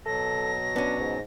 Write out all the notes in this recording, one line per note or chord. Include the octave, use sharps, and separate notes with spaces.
B2 F#3 A4 A#6
B3 C#4 D4
G#2